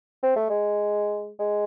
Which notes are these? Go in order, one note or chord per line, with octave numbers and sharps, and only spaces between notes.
C4
A3
G#3
G#3